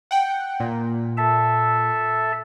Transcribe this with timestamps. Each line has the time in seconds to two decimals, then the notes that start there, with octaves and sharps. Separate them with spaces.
0.11 F#5 G5
0.60 A#2
1.17 A4 E5 A5